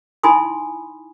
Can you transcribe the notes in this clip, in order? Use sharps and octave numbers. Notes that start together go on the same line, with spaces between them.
D#4 E4 G#5 B5 C6 D#6